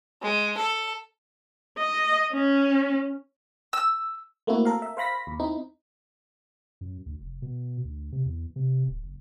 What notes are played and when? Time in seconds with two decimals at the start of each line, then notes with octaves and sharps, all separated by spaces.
0.22 G#3
0.57 A4
1.78 D#5
2.33 C#4
3.73 E6
4.47 A3 A#3 C4 E4 F#4
4.65 A4 A#4 F5
4.82 E5
4.97 C5 F5 B5 A#6 B6
5.27 D#2
5.40 C4 D#4 E4
6.81 F#2
7.06 D2
7.21 F1
7.42 B2
7.85 D2
8.12 C3
8.26 E2
8.56 C3
8.87 D1
9.03 F#1